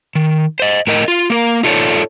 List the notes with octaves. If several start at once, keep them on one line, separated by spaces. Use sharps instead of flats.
D#3
C5 D#5
A2 A#4 D#5
F4
A#3 A#4
D#4 F4 A4 B4 C#5 D5